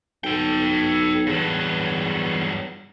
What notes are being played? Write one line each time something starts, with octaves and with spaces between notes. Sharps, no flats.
B1 A4 G5
E2 G2 F#3